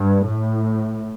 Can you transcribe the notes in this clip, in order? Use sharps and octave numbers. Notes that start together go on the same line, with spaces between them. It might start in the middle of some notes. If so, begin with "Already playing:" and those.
Already playing: G2
A2